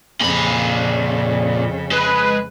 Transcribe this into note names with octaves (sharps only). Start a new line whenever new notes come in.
F2 A#2 C#3 B5
G#3 B4